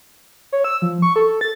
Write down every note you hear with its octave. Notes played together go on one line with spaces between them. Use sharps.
C#5
E6
F3
C#6
A4
A6